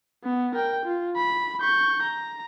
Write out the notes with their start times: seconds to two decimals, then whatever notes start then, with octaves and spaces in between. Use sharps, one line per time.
0.24 B3
0.55 A#4 G5
0.85 F4
1.16 B5
1.61 C#6 G6
2.02 A#5